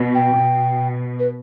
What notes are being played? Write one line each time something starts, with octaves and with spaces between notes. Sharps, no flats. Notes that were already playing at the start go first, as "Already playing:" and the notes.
Already playing: B2
G5
B2
B4